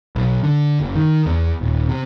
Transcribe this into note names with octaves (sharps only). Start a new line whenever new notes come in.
B1
D3
F#1
D#3
E2
D#1
C3